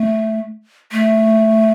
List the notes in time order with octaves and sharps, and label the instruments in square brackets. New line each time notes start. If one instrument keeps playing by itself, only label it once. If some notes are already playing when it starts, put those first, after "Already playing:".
Already playing: [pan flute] A3
A3